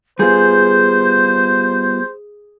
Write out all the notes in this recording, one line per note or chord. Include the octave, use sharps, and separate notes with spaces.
G3 B3 F4 G#4 C5 G6